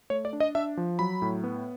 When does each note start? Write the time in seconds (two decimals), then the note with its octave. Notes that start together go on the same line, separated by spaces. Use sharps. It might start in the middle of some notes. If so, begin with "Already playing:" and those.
0.10 A3 C#5
0.25 D5
0.33 D4
0.40 D#5
0.55 D4 E5
0.77 F3
0.99 F#3 B5
1.22 A2
1.44 B3